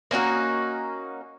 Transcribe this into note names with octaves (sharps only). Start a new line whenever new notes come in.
A#3 C#4 D#4 F#4